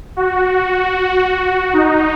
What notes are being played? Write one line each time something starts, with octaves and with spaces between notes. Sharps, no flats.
F#4
D#4